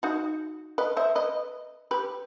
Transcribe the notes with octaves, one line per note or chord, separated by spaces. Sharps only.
D#4 F#4
B4 D#5
C5 E5
B4 D#5
G4 B4